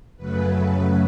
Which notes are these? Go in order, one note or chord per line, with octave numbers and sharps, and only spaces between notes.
F#2 C#3 F#3 A3 B4